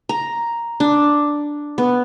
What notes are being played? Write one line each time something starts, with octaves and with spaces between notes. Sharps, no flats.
A#5
D4
B3